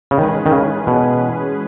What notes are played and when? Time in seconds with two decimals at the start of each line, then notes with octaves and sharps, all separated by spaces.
0.11 C#3
0.18 D#3 E3 G#3 C#4 G#4 B4
0.46 D#3
0.52 C#3
0.87 B2